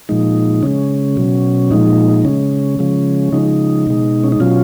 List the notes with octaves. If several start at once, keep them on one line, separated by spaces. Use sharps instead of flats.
A#2 F3 G#3 D#4
C#3 G#3 C#4
B2 F#3
A#2 F3 G#3 D#4
C#3 G#3 C#4
C#3 F3 G#3
C#3 F3 G#3 D#4
B2 G#3
C#4
D#4
B2 F#3 C#4 F4